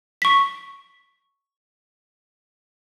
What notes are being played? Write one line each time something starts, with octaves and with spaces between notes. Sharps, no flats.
C#6 B6